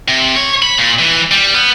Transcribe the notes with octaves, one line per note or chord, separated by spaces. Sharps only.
C3
C#5
B5
A#2
E3
G3
B3